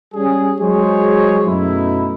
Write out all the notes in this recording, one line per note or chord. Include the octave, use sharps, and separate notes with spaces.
G3 C#4 G#4
F#3 G#3 F#4 G#4 C5 C#5
F#2 B2 A3 D#4 E4